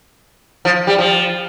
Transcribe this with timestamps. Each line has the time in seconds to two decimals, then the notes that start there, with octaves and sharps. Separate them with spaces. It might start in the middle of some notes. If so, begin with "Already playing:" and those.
0.65 F3
0.87 G3
0.99 F3